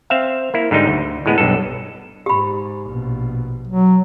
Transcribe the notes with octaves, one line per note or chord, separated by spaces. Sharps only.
C4 E5 F5
A#3 E4
G#2 D3 G3 D#4
D2
A2 G#3 B3
B1 G2 A4
G#2 G4 B5
A#1 B2
F#3